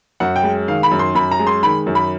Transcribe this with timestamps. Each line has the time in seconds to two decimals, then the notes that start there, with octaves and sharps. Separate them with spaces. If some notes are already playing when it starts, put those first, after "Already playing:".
0.20 F#2 F#5
0.36 G5
0.43 G#3
0.68 D#3 F5
0.83 B5
0.91 F#2
0.99 C6
1.15 F#2 B5
1.31 A#5
1.39 G#3
1.47 C6
1.63 D#3 B5
1.87 F#2
1.95 B5